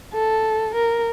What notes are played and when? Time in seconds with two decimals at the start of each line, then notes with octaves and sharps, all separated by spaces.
0.14 A4
0.75 A#4